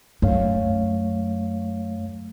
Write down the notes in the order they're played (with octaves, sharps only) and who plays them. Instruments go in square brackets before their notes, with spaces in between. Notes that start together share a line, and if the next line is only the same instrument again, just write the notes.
[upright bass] F#2 D3 [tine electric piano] A3 C#5 F5